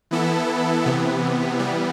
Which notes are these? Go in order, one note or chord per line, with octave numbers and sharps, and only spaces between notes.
E3 B3 E4 A4
C3 E3 B3
E3 G3 B3